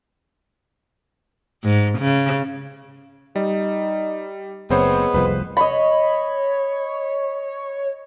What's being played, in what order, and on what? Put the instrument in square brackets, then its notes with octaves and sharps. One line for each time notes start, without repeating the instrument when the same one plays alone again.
[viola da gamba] G#2
C#3
[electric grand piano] G3 [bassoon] D#4
[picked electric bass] F#1 [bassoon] G#3 [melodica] B3 [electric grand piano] C4 C5 C#5
[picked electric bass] F1 C2 F2 [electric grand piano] B4 C5
[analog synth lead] C#5 [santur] D#5 B5